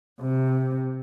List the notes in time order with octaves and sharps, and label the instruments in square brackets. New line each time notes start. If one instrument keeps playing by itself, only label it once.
[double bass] C3